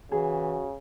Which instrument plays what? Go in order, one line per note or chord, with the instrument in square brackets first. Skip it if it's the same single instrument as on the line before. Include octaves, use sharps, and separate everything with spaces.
[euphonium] C#3 [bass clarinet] E3 [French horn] F#4 [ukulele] G#4